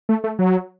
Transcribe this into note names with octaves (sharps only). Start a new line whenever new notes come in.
A3
A3
F#3